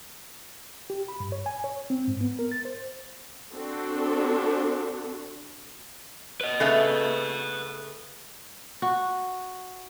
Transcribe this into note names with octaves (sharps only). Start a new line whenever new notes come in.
G4
B5
G2
C#5
G#5
C#5
C4
G#2
B3
A#4
A6
C5
C4 D4 F#4 A4
B4 D#5
C#3 A3 B3
F#4